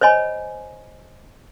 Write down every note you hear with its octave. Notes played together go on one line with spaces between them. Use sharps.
C5 C#5 D#5 G#5 B5